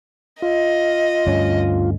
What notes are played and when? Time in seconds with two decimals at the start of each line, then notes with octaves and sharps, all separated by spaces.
0.42 F4 D#5
1.27 D2 G2 C#4